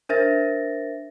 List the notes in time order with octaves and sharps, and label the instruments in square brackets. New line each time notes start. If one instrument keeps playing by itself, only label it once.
[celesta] D4 A#4 C5 E5 A6 A#6